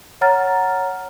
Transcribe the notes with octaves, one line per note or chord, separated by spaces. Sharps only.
C#5 F#5 A#5 F6 A6